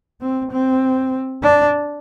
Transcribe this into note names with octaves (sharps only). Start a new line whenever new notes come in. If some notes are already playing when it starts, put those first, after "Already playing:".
C4
C4
D4